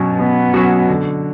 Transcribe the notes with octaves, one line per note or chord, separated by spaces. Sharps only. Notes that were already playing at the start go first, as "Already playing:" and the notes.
Already playing: B2 F#3 C#4 F#4
B2 B3
F#3 C#4 F#4
D3